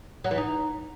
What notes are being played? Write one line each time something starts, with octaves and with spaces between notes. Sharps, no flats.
F#3
E3
D#4